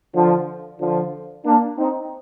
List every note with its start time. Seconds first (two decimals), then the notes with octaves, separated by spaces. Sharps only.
0.14 D3 F3
0.80 D3 F3
1.45 A#3 D4
1.79 C4 D#4